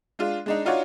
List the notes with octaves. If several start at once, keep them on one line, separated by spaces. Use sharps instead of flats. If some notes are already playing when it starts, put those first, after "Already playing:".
G#3 D4 F4
G#3 D4 D#4
D4 D#4 F4 F#4 C#5 D5